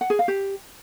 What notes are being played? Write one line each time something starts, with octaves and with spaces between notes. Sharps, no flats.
F#5
G#4
F5
G4